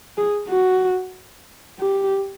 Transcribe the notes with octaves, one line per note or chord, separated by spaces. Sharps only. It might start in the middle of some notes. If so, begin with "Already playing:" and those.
G#4
F#4
G4